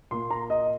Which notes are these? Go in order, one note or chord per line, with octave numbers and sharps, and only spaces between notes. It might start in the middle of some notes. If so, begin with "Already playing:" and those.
A#2 A#3 C6
A#5
D#5